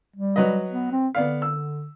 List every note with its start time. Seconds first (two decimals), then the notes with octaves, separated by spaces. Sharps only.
0.16 G3
0.36 F#3 B4 D#5
0.71 B3
0.92 C4
1.15 D3 B3 D5 F5
1.42 E6